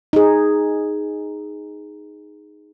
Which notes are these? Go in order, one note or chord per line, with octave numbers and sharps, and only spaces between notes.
D#4 G#4